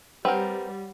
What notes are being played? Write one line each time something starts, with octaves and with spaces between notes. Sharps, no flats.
G3 C4 A#4 B4 C#5 F#5 B5